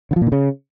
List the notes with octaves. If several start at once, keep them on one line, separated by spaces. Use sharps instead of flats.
D3
F3
A#2
D#3
C#3